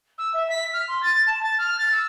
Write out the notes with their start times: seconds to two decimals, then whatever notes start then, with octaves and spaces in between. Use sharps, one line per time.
0.18 E6
0.33 E5
0.50 B6
0.73 F6
0.88 C6
1.02 A6
1.27 A5
1.43 A6
1.58 F6
1.79 A6
1.92 E6